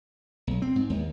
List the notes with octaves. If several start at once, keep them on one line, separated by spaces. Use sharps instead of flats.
B1
C4
G#2
D#2